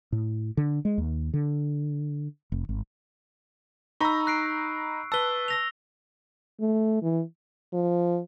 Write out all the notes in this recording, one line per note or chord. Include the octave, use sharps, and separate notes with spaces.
A2
D3
G#3
D#2
D3
F1
G#1
D#4 A#5 B5 C#6 E6
F#6 C7 D7
B4 A5 E6 G7
E6 A#6 F7
A3
E3
F3